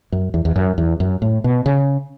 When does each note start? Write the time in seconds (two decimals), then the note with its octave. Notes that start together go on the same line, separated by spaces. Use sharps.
0.12 F#2
0.34 E2
0.45 E2
0.56 F#2
0.78 E2
1.00 F#2
1.22 A2
1.44 B2
1.66 C#3